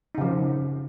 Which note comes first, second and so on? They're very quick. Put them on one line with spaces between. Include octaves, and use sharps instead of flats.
D#4 C#3 F3